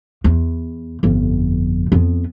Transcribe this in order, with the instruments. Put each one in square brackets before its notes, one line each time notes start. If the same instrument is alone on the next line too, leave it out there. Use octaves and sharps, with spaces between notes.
[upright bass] E2
G1 F2
F2 B3